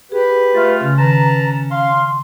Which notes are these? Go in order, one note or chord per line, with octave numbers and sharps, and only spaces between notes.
G4 G#4 B4
A3 F4
C#3 C#4
D#3 B4 A5 A#5
F5 C6